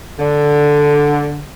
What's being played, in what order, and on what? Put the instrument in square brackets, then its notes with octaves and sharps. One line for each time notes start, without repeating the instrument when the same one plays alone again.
[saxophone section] D3